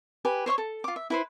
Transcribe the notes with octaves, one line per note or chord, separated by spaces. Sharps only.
G4 B4 G#5
C5 C#5 E5 C#6
A4
F4 D6
E5
E4 B4 C5